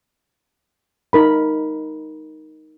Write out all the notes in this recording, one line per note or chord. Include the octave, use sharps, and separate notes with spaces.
D#4 A#4 B5